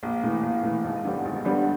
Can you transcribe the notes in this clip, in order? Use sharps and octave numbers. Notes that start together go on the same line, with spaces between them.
A#1
A2 E3
A#1
A2 E3
G#1
G2 D3 G3 B3
G#1
G2 D3 G3 B3